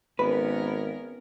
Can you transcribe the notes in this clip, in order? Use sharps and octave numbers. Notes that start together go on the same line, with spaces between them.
G#1 B3 C#4 A#4 B4